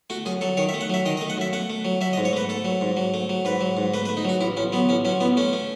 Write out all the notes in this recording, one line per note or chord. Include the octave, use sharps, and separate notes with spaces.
A3 F#4
F#2 G#4
F#3 A4
D#3 C#5
E5
A3
F#5
F#3 E5
D#3 D#5
D#5
A3
F#5
F#2 E5
A3 F#5
A3
F#3
F#3 E5
D#5
G#2
C#5
A3 B4
A3 A4
F#3
G#2
F#3
A3
F#3
G#2 B4
F#3
G#2
A3 B4
B4
A3
D#4
F#3 F#4
A1 E4
A1 C#4
F#3 B3
A1 C#4
F#3 C#4
A1 B3
A3 C#4
A3